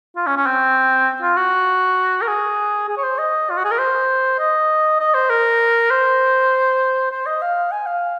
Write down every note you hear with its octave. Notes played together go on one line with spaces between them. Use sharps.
F4
C#4
C#4
C4
F4
F#4
A#4
G#4
G#4
C#5
C5
D#5
F4
F#4
G#4
A#4
C5
D#5
D#5
C5
A#4
C5
C5
D#5
F5
G#5
F5